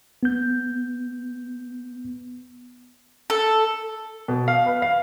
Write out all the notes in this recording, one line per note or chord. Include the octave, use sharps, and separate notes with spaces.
B3 G6
A4
B2
F5
B4
F5